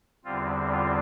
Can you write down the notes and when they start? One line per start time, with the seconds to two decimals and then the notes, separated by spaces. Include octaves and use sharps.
0.25 E2 D3 G3 C4 F4
0.71 F4